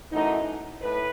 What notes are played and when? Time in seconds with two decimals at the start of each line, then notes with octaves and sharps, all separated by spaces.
0.12 F#2 E3 A3 D#4
0.81 A2 B4